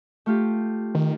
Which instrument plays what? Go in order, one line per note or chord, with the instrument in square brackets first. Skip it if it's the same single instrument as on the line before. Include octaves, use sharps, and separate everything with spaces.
[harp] A3 F4 G4
[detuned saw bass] D#3